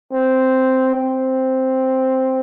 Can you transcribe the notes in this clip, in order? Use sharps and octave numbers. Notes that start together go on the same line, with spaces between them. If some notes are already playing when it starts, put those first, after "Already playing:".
C4
C4